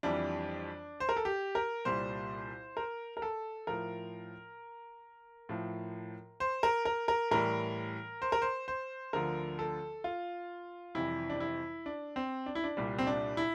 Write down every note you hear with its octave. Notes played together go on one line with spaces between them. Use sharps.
F2 E3 G3 D4
C5
A#4
A4
G4
A#4
C2 A#2 G3 C5
A#4
A#4
A4
A2 F3 A#4
A2 F3
C5
A#4
A#4
A#4
A2 E3 G3 A#4
C5
A#4
C5
C5
D2 D3 F3 A#4
A4
F4
F2 C3 E3 G3 E4
D4
E4
D4
C4
D4
E4
D4
C2 A#2 G3
C4
D4
E4